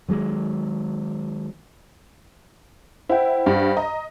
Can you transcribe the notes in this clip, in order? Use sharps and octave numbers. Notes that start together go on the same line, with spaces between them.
D#3 F#3 G#3
E4 C5 F#5 G5
G2
D#5 A#5